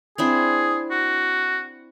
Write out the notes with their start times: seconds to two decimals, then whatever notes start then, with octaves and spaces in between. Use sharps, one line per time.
0.18 C4 D4 E4 G#4
0.91 F#4